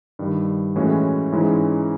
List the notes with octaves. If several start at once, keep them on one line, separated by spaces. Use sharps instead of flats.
G2 D#3 G3
A2 E3 G#3 C#4 F#4
G#2 E3 G#3 C#4 E4